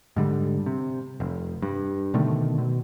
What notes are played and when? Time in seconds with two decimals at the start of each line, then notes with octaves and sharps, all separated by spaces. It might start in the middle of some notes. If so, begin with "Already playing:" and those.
0.16 G#2 D3 G3
0.66 C3
1.20 F1
1.62 G2
2.14 B2 D3 D#3 A3
2.58 B2